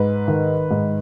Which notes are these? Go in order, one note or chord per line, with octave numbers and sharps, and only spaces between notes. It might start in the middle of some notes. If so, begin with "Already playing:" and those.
Already playing: G#2 B4
D#3
G#2